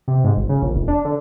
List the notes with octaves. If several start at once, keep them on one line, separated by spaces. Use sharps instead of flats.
C3
G#2
G#1
C#3
A#1
F1
D4
D3